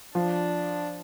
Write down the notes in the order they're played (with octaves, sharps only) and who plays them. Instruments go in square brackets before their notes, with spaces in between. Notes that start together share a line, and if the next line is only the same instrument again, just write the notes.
[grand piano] F3 [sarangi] D4